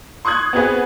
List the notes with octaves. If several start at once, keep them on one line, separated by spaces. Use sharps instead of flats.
C6 C#6 D#6 F#6 G#6
B3 C4 F#4 G#4 B4